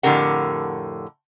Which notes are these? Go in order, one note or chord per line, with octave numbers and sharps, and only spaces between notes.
F2 A2 D3 G4 A#4 F#5